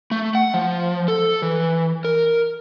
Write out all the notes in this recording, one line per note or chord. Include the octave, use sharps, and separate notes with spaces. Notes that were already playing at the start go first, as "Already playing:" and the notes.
A3
F#5
F3
A4
E3
A#4